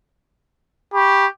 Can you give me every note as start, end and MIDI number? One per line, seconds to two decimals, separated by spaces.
0.94 1.27 67
0.94 1.25 83
0.94 1.25 85